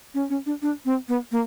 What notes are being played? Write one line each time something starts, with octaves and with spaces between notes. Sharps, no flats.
C#4
C#4
D4
D4
C4
B3
A#3